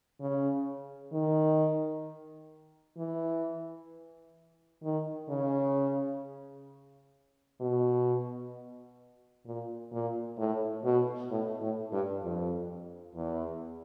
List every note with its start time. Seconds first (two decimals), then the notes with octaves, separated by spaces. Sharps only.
0.20 C#3
1.13 D#3
2.98 E3
4.83 D#3
5.29 C#3
7.60 B2
9.46 A#2
9.92 A#2
10.38 A2
10.84 B2
11.31 A2
11.62 A2
11.92 G2
12.23 F2
13.15 E2